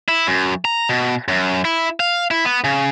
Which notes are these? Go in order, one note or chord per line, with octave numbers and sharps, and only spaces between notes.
E4
F#2
A#5
B2
F#2
E4
F5
E4
B3
C#3